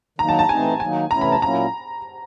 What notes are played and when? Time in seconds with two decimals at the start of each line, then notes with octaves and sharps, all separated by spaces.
0.19 D#3 F#3 A#3 D#4 A#5
0.29 A5
0.39 A5
0.49 E3 A3 C4 D#4 G#5
0.80 D#3 F#3 A#3 D#4 G#5
1.11 C3 E3 A3 C#4 E4 A#5
1.21 B5
1.32 A5
1.42 A#2 F#3 A#3 C#4 E4 A#5